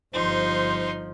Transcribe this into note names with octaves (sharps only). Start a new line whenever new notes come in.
G1 F3 D#4 C5 C6